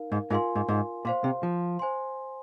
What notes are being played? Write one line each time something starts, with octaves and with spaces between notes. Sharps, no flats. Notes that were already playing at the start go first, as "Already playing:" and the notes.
Already playing: D#4 A#4 F5
G#2
G#2 F4 A#4 F5 G#5 C6
G#2
G#2
A#2 C5 F5 C6
C3
F3
C5 G#5 C6